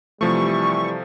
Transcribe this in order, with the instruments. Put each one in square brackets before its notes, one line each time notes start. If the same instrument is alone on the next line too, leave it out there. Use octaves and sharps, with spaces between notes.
[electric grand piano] C3 F3 A3 [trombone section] E3 G3 [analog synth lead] C#6